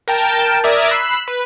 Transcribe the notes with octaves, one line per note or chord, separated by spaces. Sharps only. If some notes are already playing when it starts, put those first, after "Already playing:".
A#4 G5 A5
A#4 D5 E5 D#6 G#6
B5 E6 F#6 C7
B4